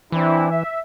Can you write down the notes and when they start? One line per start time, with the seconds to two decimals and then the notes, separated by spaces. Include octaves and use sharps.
0.12 E3 C4 D4 E4
0.51 E5